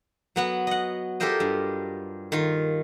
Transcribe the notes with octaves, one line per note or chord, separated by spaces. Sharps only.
F#3 B3 F#4
D#5 F#5
F4 G4 A4 A#4 C5 D#5
G2
D#3 F4